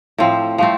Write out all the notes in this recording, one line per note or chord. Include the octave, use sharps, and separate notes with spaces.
A2 F3 C4
F3 A3 C4